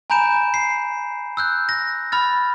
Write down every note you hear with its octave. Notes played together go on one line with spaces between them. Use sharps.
G#5 A#5 B5 G6 D7 E7
C7
E6 F#6 G6
A#6
B5 F6 A6